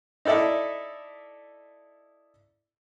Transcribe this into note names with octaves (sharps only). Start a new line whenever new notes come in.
D#4 E4 A4 D5 E5